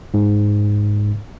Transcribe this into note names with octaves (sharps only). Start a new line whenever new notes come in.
G#2